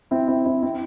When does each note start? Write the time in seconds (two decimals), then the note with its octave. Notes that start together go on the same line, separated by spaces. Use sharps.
0.11 C4 E4
0.28 C4 E4
0.45 C4 E4
0.63 C4 E4